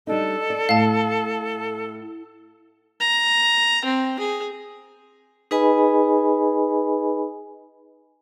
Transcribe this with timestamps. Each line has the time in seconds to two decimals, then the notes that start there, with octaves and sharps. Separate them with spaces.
0.07 G3 D4 D#4 A4
0.50 D5
0.69 A2 F5 A5
3.01 A#5
3.85 C4
4.19 G#4
5.51 D#4 G#4 B4 D#5 G#5 B5